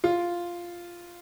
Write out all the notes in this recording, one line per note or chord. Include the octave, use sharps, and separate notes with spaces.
F4